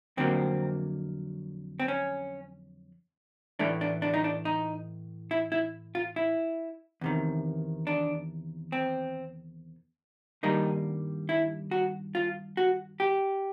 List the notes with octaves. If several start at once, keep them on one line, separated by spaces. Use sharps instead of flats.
F2 D3 F#3 A#3 C4
C4
C#4
A2 E3 A3 D4
D4
D4
D#4
D4
D#4
E4
E4
F4
E4
E2 C3 D#3
D4
C4
G2 D#3 G3 A#3 D#4
E4
F#4
F4
F#4
G4